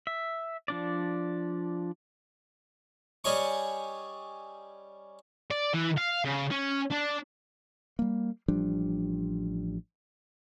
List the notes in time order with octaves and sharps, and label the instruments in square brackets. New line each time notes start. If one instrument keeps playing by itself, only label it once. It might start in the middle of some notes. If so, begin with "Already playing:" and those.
[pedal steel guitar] E5
F3 D4 D5
[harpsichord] G3 C#4 G#4 D#5 C#6
[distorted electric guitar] D5
E3
F5
C#3
C#4
D4
[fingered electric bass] G3 A#3
A1 F3 G3 D4